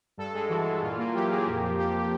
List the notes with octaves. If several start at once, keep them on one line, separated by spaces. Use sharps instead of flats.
G2 A4
G#3
E3 F#4
E3
A#2 F4
A#3
F4
F#3 G4
A#3 G#4
F2 G4
F3
F3 G4